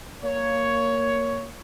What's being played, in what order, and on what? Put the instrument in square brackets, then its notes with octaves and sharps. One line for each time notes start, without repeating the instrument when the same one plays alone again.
[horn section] A#3 C#5